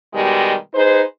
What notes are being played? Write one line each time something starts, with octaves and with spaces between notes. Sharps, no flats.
B2 D#3 G3 G#3 G4
D#4 G#4 B4 C5